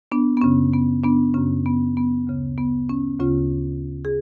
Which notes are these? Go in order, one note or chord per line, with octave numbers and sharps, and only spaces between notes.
B3 D4
B3
F#2 C#3 C#4
B3
B3 D4
F#2 C#3 C#4
B3
B3
D2 C#3
B3
C#4
D2 C#3 C#4 F4
G#4